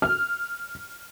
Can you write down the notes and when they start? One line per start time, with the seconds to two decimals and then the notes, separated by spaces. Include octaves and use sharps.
0.02 F6